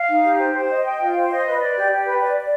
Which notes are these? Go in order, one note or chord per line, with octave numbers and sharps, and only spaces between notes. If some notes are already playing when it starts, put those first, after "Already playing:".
Already playing: F5
D#4
G4
C5
C5
D#5
G5
F4
C5
D#5
B4
D5
G4
G4
B4
D5
D5